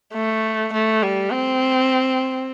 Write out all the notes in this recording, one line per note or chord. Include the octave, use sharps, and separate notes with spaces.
A3
A3
G3
C4